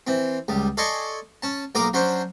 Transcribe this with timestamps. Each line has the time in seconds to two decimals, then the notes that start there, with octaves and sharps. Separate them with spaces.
0.07 E3 C4
0.48 C#2 G3
0.77 A4 D5 D#5 G#5 C6 C#6
1.43 C#4 A5
1.75 B1 A#3 A#4 D6 D#6
1.93 F#3 C#4 D4 C5